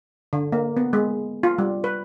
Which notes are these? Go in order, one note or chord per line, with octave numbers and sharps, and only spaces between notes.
D3
A#3
B3
G#3
F4
G3
B4